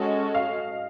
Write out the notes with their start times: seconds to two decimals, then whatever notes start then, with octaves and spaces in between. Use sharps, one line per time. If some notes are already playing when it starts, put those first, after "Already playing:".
Already playing: G#3 C#4 F#4 A4 D#5
0.35 F5